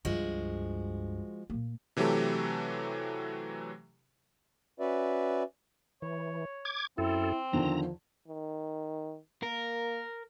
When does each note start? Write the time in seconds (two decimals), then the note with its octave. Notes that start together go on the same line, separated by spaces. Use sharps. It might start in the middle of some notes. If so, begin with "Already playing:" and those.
0.05 C#2 G2 F3 G#3 F#4
1.50 A#2 A#3
1.97 C3 E3 F#3 A3 G4 A4
4.80 C#4 F#4 B4 D5 E5
6.02 E3 C#5
6.65 D6 G#6
6.98 F#2 C4 E4 A4
7.53 E2 D3 D#3 F3 A#5
8.28 D#3
9.43 A#3 A#4